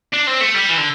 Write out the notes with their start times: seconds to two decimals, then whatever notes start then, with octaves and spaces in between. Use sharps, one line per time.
0.13 D4
0.27 C4
0.41 A3
0.55 G3
0.69 E3
0.78 D3